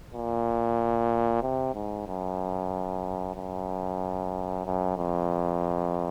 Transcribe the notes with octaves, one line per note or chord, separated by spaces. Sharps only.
A#2
C3
G#2
F#2
F#2
F#2
F2